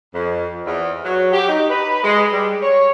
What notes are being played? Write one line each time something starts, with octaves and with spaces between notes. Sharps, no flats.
F2
E2
F#3
G4
D#4
B4
G#3
G3
C#5